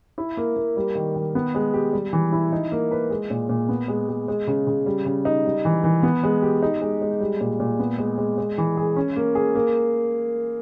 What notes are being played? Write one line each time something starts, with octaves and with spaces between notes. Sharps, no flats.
E4
A#3
A#3
G3
D#3
D#3
B3
G#3
G4
G3
E3
E4
D#4
A#3
B4
G#3
A#2
A#2
B3
G#3
G#3
G#3
C#3
C#3
G3
C#3
D#4
G3
E3
E3
B3
G#3
G4
D#4
G#3
G#3
G3
A#2
A#2
B3
G#3
G#3
G#3
E3
G#4
C#4
A#3
G#4
A#3